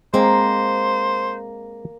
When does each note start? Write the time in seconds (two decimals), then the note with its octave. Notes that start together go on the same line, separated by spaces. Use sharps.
0.14 G#3 A#3 C4 C5